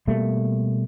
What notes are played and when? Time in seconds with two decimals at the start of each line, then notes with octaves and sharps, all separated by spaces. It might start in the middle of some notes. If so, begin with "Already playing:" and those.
0.07 B2 G3 A3 A#3